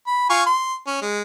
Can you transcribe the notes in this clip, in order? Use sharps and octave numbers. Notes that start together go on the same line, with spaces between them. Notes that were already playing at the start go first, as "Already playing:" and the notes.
B5
F4 G#5 C#6
C6
C#4
G#3